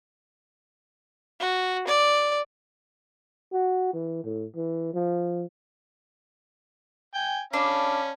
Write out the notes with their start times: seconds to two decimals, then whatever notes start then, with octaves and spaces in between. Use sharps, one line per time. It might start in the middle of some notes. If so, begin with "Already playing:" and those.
1.40 F#4
1.87 D5
3.52 F#4
3.93 E3
4.24 A2
4.56 E3
4.94 F3
7.14 G5 G#5
7.53 C#4 D4 F5 B5